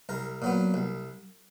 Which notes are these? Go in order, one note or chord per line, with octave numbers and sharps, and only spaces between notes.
C2 A#4
A#2 F#3 B3
C2